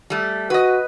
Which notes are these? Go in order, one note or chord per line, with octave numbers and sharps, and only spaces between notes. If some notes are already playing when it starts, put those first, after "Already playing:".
G3 A3
F#4 B4 D#5